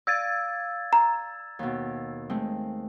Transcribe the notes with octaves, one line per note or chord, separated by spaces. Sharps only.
D5 F5 E6 G#6 A6
A#5
D#2 B2
G#3 A3 C4